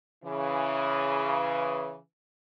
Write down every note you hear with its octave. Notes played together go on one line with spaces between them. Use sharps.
C#3 E3